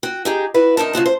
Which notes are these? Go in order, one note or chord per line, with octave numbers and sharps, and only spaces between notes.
F#4 G5
D#4 G4 G#4
E4 F#4 B4
D2 D#4 A#4 A5
C#3 F4 F#4 A5
C5